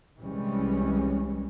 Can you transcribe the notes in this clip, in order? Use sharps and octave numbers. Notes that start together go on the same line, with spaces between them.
C2 E3 G3 G#3 C#4